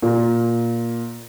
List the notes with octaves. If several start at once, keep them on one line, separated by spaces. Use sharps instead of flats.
A#2